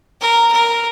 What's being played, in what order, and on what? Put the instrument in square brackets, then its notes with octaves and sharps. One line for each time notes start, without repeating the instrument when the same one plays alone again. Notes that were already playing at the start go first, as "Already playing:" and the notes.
[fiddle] A#4
A#4